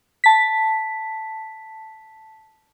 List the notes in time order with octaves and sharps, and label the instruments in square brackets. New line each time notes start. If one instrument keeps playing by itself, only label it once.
[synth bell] A5 B6